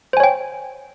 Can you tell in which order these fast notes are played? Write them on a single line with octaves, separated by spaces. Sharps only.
C5 G#5 C#5 G5